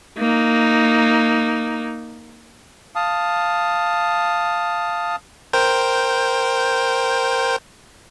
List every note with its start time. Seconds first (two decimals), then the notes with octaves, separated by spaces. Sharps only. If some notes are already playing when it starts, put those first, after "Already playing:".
0.19 A#3 D#4
2.95 F5 A5 D#6
5.53 A#4 C5 G5